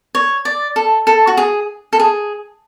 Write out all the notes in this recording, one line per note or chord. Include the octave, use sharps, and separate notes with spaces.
C#5
D5
A4
A4
F#4
G#4
A4
G#4